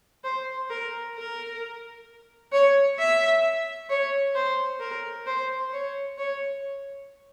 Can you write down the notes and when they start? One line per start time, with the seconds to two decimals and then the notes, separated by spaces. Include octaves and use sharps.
0.24 C5
0.70 A#4
1.16 A#4
2.53 C#5
2.99 E5
3.90 C#5
4.35 C5
4.80 A#4
5.27 C5
5.73 C#5
6.18 C#5